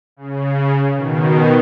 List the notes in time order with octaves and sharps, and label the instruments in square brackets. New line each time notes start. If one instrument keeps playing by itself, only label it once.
[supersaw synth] C#3
B2 D#3